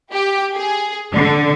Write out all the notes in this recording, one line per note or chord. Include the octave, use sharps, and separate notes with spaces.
G4
G#4
D3